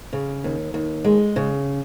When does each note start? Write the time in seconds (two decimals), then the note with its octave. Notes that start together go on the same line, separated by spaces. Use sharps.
0.13 C#3
0.44 D#2
0.74 D#2
1.04 G#3
1.36 C#3